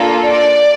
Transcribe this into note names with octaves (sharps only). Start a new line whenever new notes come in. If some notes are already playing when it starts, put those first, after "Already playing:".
Already playing: A#3 D4 F4 A4
D5